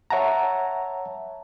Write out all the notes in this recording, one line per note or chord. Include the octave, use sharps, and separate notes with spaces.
C#5 E5 F#5 A5 A#5